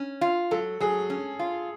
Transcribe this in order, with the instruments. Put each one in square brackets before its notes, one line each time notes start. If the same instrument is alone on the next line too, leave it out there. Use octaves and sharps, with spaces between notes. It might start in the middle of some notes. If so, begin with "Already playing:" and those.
Already playing: [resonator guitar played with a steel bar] C#4
F4
[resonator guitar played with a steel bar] F#3 [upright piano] A4
[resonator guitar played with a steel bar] F#3 [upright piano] G#4
[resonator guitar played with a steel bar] C#4
F4